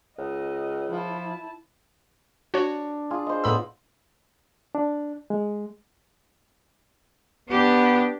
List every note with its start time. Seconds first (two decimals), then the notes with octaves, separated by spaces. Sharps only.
0.19 C#2 D#5
0.90 F3 E4 A5
2.54 D4 F#4 C#5
3.11 F4 G#4
3.27 C5 D#5
3.44 A2 B3 B5 E6
4.75 D4
5.30 G#3
7.49 B3 D4 G4